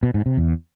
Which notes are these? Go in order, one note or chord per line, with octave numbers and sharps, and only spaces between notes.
B2
G#2
C3
E2